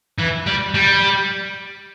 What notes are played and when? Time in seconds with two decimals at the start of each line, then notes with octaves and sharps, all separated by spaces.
0.18 E3
0.46 G3
0.74 G3